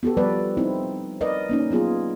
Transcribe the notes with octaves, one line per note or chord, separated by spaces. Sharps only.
B3 F#4 G4 A4
F3 G3 B4 D5
C4 D#4 E4
A#4 B4 D5 D#5
A#3 C#4 D#4
F#3 B3 F4 G#4